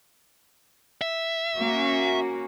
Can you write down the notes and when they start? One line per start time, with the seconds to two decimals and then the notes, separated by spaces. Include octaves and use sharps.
1.01 E5
1.56 A#3 C#4 F#4